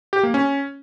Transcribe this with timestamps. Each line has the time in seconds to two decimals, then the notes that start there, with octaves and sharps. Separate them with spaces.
0.13 G4
0.23 A#3
0.34 C#4